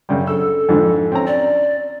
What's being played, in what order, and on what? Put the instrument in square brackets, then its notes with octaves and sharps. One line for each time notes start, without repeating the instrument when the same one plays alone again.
[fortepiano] F#2 C#3 G3
[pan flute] A4 [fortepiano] E6
[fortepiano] F2 G#2 D3
C4 C#4 A#5
[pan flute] D5